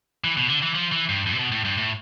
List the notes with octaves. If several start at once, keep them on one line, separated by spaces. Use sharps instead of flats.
E3
B2
D3
E3
F3
E3
G2
F2
C3
B2
A2
G2
A2